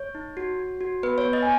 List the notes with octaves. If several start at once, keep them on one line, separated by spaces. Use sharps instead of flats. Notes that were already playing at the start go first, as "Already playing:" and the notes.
Already playing: C#5
D#4
F#4
F#4
F#4
B3 B4
C#5
B3
D#5
G#5